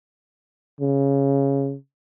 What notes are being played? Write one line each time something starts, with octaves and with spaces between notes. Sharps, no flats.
C#3